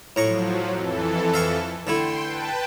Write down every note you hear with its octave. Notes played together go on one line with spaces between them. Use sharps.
A2 F3 F#3 A#5 C#6
F2 E3 A4
E5 F5 C#6
D3 A3 E4 G5 C6
B4 G5 A5